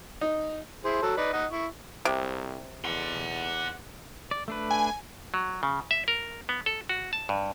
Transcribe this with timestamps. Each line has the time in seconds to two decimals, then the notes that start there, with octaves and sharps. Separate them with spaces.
0.21 D#4
0.85 E4 G#4 C5
1.02 F#3 A4
1.17 D#4 B4 D5
1.33 D#4 D#5 F#5
1.52 E4 C#6
2.05 C2 C3
2.85 E2 F#5 C6
4.31 D5
4.48 A3 D4 B4
4.71 G#5
5.34 F#3
5.63 C#3
5.91 E5
6.08 A#4
6.49 B3
6.66 A4
6.89 F#4
7.13 A5
7.29 G2